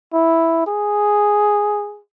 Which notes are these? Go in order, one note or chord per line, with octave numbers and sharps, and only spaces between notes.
E4
G#4